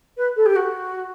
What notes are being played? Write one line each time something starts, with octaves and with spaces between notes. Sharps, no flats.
B4
A4
G4
F#4